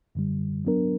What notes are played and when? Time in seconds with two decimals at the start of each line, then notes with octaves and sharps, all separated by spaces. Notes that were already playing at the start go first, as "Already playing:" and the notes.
0.15 F#2 D3 G3
0.65 F#3 B3 D4 A#4